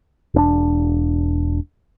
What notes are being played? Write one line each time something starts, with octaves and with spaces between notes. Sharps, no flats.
E1 C#4 D4